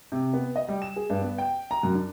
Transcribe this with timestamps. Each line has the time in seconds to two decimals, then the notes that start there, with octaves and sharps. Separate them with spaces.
0.12 C3
0.34 B3
0.56 D#5
0.68 G3
0.82 E7
0.96 G#4
1.10 G2
1.21 B3
1.38 G5
1.71 A#5
1.83 F#2
1.95 D4